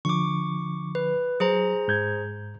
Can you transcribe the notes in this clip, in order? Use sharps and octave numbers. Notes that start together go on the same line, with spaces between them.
D3 F3 C#6 D6
B4
F#3 G#4 C5 A#5
G#2 G6 G#6